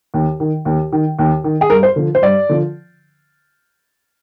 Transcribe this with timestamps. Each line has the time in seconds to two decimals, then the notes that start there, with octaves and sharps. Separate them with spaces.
0.14 D#2
0.40 D#3
0.65 D#2
0.92 D#3
1.19 D#2
1.44 D#3
1.61 G#4
1.70 G2 A#4
1.83 C5
1.96 D3 F3
2.15 C5
2.22 G2 D5
2.49 D3 F3